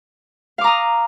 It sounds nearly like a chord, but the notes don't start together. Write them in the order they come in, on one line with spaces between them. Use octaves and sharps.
F5 D6 A#5 D#6